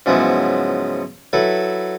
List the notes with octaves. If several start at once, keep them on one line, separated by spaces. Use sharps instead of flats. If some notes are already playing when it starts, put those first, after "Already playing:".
G#2 C#3 F3 F#3 B3 E4
F#3 E4 A4 B4